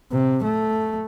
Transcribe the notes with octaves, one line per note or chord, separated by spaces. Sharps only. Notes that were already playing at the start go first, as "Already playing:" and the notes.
C3
A3